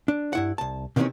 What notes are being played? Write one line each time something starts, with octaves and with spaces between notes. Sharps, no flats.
D4
G2 E4 F#5
C2 A5
C3 D#3 E3 G#3 C4 C#4